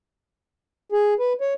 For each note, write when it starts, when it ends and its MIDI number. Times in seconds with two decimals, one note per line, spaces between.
0.92 1.14 68
1.20 1.33 71
1.41 1.54 73